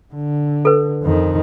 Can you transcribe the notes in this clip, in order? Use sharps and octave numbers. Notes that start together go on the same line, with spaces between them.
D3
A4 B4
F2 D#3